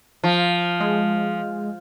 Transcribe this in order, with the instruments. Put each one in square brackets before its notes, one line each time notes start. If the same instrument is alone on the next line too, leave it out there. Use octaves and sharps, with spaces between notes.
[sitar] F3
[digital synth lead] G#3